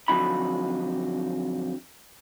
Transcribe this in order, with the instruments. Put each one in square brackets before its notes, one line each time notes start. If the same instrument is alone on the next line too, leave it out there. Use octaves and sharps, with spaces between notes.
[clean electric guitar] F2 D3 F#3 D#4 B5